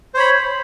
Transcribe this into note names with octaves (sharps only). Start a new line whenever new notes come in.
C5 C#5 B5